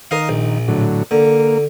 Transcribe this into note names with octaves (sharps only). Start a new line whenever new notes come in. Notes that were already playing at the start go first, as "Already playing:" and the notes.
D#3 A#4 D#5 F5
A#1
A2 D3 F#3
D3 A#3